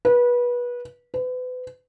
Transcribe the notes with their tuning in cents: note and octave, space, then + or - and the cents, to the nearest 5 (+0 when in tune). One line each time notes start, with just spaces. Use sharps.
B4 -25
B4 +35